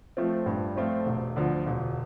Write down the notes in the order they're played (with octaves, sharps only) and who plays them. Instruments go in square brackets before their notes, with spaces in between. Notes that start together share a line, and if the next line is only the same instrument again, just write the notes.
[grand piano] F3 A3 C4 F4
G2
F3 A3 C4 F4
E1
D2 D3 F3
E1